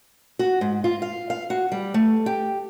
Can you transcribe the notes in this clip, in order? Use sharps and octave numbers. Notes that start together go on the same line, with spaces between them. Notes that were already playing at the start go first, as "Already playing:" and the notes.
F#4
G#2
F4
F5
F5
F#4
G3
A3
G4